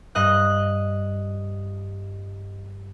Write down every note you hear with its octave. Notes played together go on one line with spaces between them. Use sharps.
G2 D#5 F#6